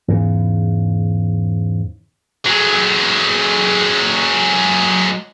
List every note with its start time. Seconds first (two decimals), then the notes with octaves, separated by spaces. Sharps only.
0.08 E2 G#2 C#3
2.46 F#3 G#3